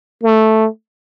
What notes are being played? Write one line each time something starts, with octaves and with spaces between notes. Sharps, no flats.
A3